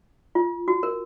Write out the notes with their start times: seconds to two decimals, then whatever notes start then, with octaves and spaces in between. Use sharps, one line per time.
0.35 F4
0.68 F#4
0.83 A#4